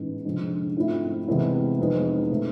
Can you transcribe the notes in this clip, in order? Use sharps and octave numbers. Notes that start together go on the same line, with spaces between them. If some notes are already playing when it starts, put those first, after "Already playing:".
Already playing: A1 G#2 G#3 B3
F1 F2 D3 G#3
G#2 F3 A3 C4 E4
E2 C3 G#3 C4 E4
F1 F2 E3 G#3 B3
B2 A3